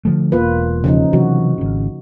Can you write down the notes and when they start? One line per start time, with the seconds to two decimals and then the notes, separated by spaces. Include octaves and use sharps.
0.05 D3 F3 A3
0.32 E1 A#3 F4 B4
0.84 C#3 F3 D#4
1.13 C3 E3 F#3 F#4
1.58 G#1 C#3